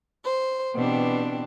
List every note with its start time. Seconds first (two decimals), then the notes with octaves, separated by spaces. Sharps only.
0.24 C5
0.75 B2 E3 C4 D4 G4